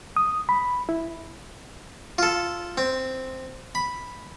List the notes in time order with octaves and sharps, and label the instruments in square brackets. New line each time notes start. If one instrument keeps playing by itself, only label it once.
[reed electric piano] D#6
B5
E4
[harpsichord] F4 A4
C4
B5